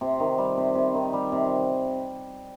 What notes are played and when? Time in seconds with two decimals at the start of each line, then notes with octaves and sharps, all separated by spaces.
0.01 C3
0.20 D#3
0.38 G3
0.57 C3
0.75 C3
0.94 D#3
1.13 G3
1.32 C3